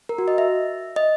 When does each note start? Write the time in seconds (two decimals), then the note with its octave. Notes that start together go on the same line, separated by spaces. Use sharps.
0.09 A#4
0.18 F#4
0.28 D#5
0.38 E5
0.96 D#5